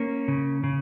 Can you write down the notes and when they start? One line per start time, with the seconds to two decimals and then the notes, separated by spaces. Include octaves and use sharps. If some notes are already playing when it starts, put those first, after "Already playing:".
Already playing: A#3 C#4
0.28 C#3
0.64 C#3